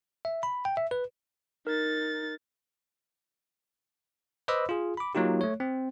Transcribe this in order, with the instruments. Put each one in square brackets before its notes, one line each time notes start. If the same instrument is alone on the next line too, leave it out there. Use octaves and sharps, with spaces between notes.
[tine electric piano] E5
B5
G5
E5
B4
[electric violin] D#4 A6 [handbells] A#4
[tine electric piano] B4 C5 D#5 B5 D6 E6
F4 G#4
B5 D6
F#3 A#3 D#4 F4 G4
A3 C#5
C4